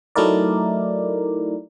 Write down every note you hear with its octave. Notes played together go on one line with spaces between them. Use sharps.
F#3 A3 D#4 E4 A#4 D5